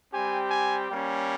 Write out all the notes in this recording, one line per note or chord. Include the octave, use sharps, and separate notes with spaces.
G3 C4 G4 G#5
G#5
G3 A#3 C#4